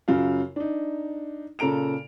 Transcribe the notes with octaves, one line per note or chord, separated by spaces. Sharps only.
F#2 C#3 F4 F5
D4 D#4
A#2 C#3 A4 A#5 D7 F7